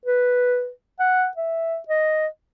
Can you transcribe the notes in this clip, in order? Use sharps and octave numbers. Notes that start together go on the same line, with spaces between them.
B4
F#5
E5
D#5